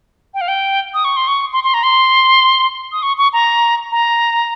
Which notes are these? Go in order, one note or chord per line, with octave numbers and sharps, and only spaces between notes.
G5
F5
G5
D#6
C#6
C6
C#6
C6
C6
A#5
C6
D#6
C#6
C#6
A#5
A#5